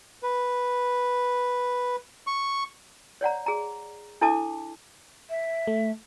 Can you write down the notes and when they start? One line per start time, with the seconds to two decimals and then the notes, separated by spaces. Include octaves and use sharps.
0.23 B4
2.27 C#6
3.21 C#5 D5 F#5 A#5
3.46 G#4 A#5
4.21 D4 E4 A4 E5 A5 D6
5.30 E5
5.67 A3